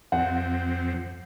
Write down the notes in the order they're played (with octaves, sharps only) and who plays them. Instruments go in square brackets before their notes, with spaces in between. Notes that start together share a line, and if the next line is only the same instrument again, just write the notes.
[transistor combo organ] F2 C4 [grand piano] F#5